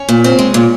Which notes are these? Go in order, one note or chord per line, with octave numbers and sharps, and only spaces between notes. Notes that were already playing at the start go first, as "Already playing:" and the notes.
Already playing: C#4
A#2
C4
G#3
A#2